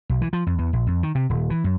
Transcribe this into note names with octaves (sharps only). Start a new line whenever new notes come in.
B1
E3
F3
F2
E2
A#1
F2
D#3
C3
D#1
E3
F#2